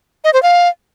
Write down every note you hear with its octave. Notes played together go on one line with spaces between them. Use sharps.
D#5
C5
F5